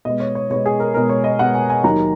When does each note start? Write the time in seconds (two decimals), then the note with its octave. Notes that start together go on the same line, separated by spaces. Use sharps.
0.05 B2 G#3 B3 D#5
0.20 C#5
0.35 C#5
0.50 B2 G#3 B3 C#5
0.66 G#4
0.80 A#4
0.94 B2 G#3 B3 A#4
1.09 C#5
1.24 D#5
1.39 B2 G#3 B3 F#5
1.54 G#5
1.70 G#5
1.84 D#2 D#3 F#3 A#3 A#5